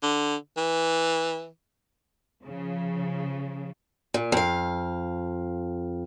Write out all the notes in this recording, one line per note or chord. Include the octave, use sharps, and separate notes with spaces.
D3
E3
C#3 F3
A#2
F2 F5